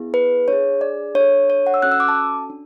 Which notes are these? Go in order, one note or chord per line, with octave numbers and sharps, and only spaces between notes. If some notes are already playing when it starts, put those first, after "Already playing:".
Already playing: B3 E4 G#4
B4
D4 G#4 C#5
D5
D4 C#5
A4
C#5
F#5
E6
C#4 F#4 A4 F#6
E6
D6
A5
D4